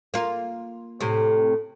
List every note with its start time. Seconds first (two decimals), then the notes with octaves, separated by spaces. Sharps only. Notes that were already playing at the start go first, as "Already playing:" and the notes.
0.14 A#3 F4
1.01 A2 C3